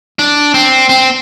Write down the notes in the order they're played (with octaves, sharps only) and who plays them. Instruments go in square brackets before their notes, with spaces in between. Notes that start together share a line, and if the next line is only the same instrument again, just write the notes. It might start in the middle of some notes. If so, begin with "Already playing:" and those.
[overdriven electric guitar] D4
C4
C4